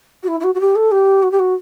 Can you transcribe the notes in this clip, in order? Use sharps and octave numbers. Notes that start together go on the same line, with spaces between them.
F#4
E4
E4
F#4
F#4
G4
A4
G4
F#4
G4
F#4